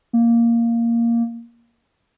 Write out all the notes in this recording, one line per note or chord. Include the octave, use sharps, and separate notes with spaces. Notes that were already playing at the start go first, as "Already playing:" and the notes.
A#3